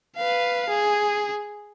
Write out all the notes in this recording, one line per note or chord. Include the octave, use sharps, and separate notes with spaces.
B4 F5
G#4